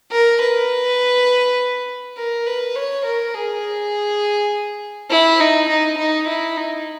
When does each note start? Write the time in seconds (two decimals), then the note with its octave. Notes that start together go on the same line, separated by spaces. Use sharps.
0.12 A#4
0.42 B4
2.17 A#4
2.47 B4
2.76 C#5
3.05 A#4
3.34 G#4
5.11 E4
5.40 D#4
5.69 D#4
5.98 D#4
6.28 E4
6.57 D#4